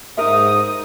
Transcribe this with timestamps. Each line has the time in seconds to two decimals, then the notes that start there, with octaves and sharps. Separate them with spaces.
0.17 G#2 D#4 A#4 E5 D#6